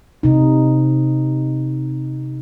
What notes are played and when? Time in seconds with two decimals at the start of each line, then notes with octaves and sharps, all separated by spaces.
0.23 C3 D#4